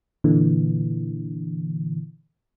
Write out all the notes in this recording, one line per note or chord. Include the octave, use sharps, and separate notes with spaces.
A#2 D3 E3